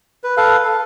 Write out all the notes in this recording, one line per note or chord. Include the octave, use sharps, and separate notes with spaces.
B4
A4 B4 F5
A4